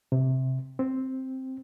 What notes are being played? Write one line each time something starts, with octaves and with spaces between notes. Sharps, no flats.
C3
C4